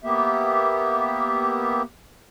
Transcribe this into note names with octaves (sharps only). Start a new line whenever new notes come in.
A#3 B3 G4 E5